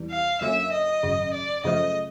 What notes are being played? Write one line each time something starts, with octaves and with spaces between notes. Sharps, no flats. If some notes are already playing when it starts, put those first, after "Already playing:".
Already playing: E2 C3 E3 G3
F5
F#2 D3 F#3 A#3 C#4 E5
D#5
G#1 F#2 C#3
D5
F#2 C#3 F3 A3 D#5